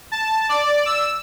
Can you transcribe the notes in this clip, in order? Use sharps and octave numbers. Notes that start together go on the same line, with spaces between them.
A5
D5
E6